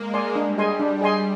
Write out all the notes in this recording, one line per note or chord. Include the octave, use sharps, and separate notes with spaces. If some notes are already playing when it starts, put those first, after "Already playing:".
Already playing: G#3 A#3
D5 G#5 C6
G3 D4
G#4 D#5 G#5 C6
D4
G#4 D#5 G#5 C6